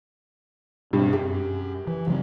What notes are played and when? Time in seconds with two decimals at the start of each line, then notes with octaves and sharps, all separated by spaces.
0.93 G2 B2 C4
1.13 F#2 G4
1.87 E3
2.07 C#3 F#3 C4